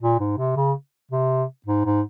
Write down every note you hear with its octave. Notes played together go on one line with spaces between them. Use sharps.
A#2
G#2
C3
C#3
C3
G#2
G#2